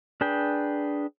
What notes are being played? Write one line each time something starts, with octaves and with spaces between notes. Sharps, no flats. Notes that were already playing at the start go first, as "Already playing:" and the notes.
D4 G#4 B4 G5